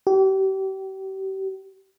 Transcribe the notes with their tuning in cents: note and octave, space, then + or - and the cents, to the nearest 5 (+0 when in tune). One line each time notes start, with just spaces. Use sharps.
G4 -35